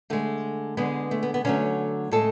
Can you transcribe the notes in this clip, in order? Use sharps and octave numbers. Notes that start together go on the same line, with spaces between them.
D3 G#3 A3
D3 G#3 B3
A3
B3
B3
D3 F#3 A3 C#4
A2 G#3 A4